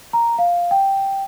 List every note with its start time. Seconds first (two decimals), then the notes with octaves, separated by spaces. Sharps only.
0.13 A#5
0.38 F5
0.71 G5